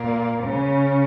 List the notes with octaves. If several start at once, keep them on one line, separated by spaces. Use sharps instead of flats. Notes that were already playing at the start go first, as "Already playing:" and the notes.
Already playing: A#2 A#3
C#3 C#4